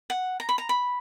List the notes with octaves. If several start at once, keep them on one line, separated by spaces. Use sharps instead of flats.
F#5
A#5
B5
A#5
B5